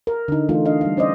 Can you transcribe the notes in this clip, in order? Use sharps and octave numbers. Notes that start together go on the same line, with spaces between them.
A#4
D3 D#4
E3 A3 D#4 F4
D4 D#5 F5
G3 F5
C#4 C5 D5 D#5